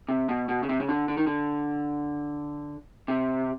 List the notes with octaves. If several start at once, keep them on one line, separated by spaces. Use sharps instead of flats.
C3
B2
B2
C#3
C3
C#3
D3
D3
D#3
D3
C3